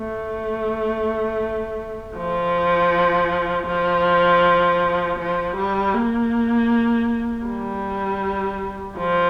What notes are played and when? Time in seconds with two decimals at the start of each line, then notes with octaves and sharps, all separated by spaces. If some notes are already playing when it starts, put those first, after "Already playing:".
Already playing: A3
2.16 F3
3.67 F3
5.19 F3
5.56 G3
5.94 A#3
7.46 G3
8.98 F3